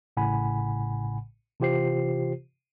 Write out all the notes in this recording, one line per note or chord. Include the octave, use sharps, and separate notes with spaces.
A1 A2 C#3 F#5 G#5 B5
C3 E3 F4 G4 C5 C7